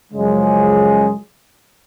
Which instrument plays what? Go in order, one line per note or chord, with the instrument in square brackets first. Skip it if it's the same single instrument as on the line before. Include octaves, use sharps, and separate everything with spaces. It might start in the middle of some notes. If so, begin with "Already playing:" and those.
[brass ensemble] F#2 C#3 F3 G#3